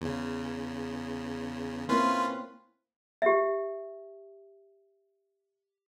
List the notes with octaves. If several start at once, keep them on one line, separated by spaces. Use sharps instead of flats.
E2 C#3
A#3 C4 C#4 E4 F4 B4 C6
G4 E5